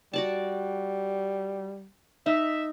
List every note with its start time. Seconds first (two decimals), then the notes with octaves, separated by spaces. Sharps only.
0.14 G3 F#4 D5 A5
2.26 D#4 E5